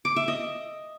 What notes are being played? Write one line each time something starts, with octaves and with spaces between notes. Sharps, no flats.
D6
E5
D#5